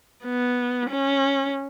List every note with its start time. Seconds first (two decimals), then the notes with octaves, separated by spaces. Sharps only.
0.24 B3
0.90 C#4